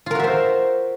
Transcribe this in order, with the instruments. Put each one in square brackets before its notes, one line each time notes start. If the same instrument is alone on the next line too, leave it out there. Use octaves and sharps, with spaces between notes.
[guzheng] F4
A#4
F#4
E5
C5